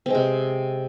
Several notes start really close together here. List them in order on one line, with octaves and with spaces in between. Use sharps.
C4 G#3 C3